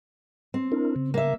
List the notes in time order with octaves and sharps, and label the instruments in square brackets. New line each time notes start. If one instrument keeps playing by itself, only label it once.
[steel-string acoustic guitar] C4
[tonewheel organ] D4 E4 A#4
C#3
[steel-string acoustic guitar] A#3 E5